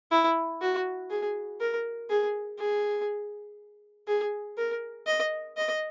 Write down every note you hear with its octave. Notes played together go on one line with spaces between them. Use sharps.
E4
F#4
G#4
A#4
G#4
G#4
G#4
A#4
D#5
D#5